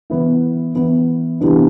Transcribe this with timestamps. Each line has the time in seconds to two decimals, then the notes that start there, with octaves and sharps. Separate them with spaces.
0.10 E3 B3 E4
0.75 E3 B3 E4
1.41 C3 E3 B3 D4